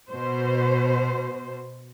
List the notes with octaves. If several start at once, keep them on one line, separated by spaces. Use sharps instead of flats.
B2 C5